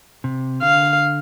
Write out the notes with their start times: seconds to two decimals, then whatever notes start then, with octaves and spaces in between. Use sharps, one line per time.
0.24 C3
0.62 D3 F5